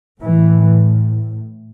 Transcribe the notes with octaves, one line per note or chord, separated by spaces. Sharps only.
A2 E3